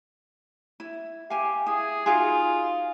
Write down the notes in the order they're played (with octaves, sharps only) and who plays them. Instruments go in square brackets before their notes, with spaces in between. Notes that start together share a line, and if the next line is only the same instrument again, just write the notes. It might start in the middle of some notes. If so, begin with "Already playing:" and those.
[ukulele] E4
[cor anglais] G4 [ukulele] F5 G#5
[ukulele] E4 [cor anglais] G#4
[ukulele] D#4 F#4 G#4 [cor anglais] F4